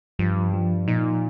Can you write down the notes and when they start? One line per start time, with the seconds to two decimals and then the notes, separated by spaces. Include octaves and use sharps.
0.19 G2 F3
0.53 F3
0.88 A#2 D#4